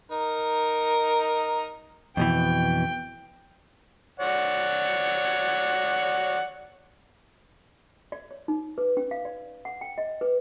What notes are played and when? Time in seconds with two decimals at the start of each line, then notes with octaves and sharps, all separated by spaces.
0.11 D#4 A#4
2.17 F2 B2 E3 G5
4.20 C#5 D5 F#5
8.12 D5
8.31 C#5
8.48 D#4
8.78 B4
8.97 C#4
9.11 F5
9.25 D5
9.65 F#5
9.81 G5
9.98 D#5
10.21 B4